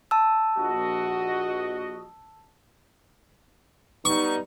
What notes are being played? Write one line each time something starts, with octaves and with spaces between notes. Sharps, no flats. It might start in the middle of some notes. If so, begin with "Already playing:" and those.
A5 E6
A#1 F#4 D#5
G3 B3 D#4 C#6